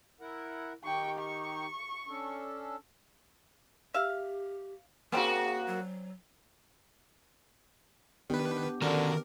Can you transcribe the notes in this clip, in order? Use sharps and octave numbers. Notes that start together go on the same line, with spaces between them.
E4 A#4 F#5
D#3 D#4 G4 G5 C#6
C#6
C#4 D4 A4
G4 E5 F5
G3 A#3 C4 C#4 F#4 G#4
F#3
D#3 B3 D4 G4 B4
D3 D#3 C#4 F#4 A#4